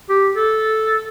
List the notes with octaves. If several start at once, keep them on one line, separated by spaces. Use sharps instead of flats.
G4
A4